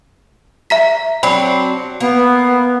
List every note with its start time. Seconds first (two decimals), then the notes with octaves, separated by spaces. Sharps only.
0.70 E5 A#5 B6
1.23 F#3 C4 D4 B5
2.00 A#3 B3